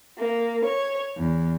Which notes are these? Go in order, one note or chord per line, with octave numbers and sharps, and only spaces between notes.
A#3
C#5
E2